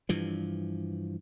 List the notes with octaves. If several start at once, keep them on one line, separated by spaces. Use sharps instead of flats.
G2 E3 F3